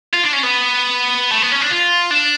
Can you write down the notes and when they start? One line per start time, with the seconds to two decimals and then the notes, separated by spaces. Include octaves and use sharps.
0.14 F4
0.24 D4
0.33 C#4
0.43 B3
1.31 A3
1.42 B3
1.51 C#4
1.61 D4
1.70 F4
2.11 D4